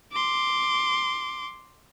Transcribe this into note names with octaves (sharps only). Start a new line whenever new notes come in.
C6 D6